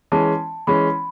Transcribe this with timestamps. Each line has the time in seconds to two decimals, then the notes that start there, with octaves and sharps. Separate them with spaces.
0.12 E3 G#3 C#4 A5
0.67 E3 G#3 C#4 B5